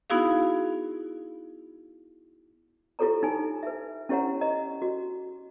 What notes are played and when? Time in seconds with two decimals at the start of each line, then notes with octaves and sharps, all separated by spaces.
0.10 B3 D#4 E4 F#4 G#4 F5
2.99 E4 F4 G4 A4 C#5 A#5
3.23 D#4 G#5
3.63 B4 E5
4.09 C#4 E4 G4 C#5 F#5 A#5
4.41 D#5 A#5
4.82 F#4